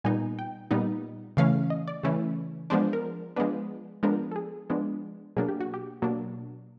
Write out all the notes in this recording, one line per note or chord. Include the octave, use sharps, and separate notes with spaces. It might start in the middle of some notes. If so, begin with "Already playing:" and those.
A#2 G3 B3 D#4 G#5
G5
A#2 G3 B3 D#4
C#3 E3 A3 C#4 F5
D#5
D5
C#3 E3 A3 C#4
F3 G#3 B3 D4 C5
A#4
F3 G#3 B3 D4 B4
F3 G#3 B3 D4 A#4
A4
G#4
F3 G#3 B3 D4
B2 F#3 A#3 D4 G#4
G4
F#4
G4
B2 F#3 A#3 D4